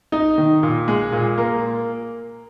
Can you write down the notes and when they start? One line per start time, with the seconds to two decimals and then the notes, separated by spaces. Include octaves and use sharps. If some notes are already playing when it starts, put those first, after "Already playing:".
0.12 D#4
0.38 D#3
0.63 A#2
0.88 G#3
1.12 A#2
1.38 A#3